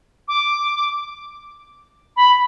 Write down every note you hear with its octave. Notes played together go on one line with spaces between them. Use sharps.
D6
B5